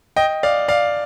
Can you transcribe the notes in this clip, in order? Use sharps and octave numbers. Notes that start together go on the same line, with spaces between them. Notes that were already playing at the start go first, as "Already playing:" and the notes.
D#5 G5
D5 F5
D5 F5